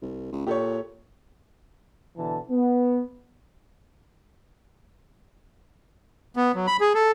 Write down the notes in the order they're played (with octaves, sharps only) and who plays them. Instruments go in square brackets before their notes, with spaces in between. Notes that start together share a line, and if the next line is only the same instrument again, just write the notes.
[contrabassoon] C2
C#2
[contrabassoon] A#2 [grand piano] G4 A4 C#5
[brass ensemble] B2 D3 E3 A5
B3
[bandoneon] B3
F#3
B5
G#4
A4